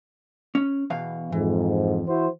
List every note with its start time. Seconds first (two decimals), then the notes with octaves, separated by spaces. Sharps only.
0.55 C#4
0.90 E2 B2 F5
1.32 F2 G#2 E3
2.08 E4 F#4 C5